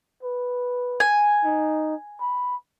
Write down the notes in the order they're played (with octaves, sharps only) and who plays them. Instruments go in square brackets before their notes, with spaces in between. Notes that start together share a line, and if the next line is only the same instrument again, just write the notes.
[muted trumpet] B4
[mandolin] G#5
[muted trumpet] D#4
B5